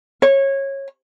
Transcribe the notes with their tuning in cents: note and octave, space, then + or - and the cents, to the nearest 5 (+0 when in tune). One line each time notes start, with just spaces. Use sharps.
C#5 -20